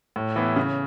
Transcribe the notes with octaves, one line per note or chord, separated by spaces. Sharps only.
A2
E3 B3 E4
C#3